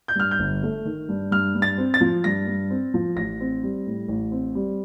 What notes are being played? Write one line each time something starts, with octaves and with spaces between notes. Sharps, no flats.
G6
G2 F6
G6
G1
A3
D#3
G2
G2 F6
G2
A6
C4
A6
F3
G2 A#6
G2
C4
F3
A1 A#6
C4
G3
A2
A1
C4
G3